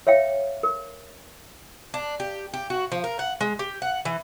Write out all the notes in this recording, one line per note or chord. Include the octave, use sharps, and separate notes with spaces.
C#5 E5 F5 G5
A#4
D4
G4
G4
F#4
F3
A#4
F#5
G#3
G4
F#5
E3